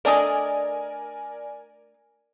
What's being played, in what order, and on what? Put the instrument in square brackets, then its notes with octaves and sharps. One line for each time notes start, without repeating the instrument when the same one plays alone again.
[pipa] A3 D4 D#5 [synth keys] A#4 D5 G#5